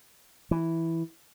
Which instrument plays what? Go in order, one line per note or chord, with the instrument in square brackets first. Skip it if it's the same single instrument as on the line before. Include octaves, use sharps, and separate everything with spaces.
[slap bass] E3